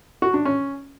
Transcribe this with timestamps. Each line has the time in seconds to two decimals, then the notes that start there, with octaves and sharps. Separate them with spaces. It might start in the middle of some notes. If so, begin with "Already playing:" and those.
0.22 F#4
0.34 D4
0.45 C#4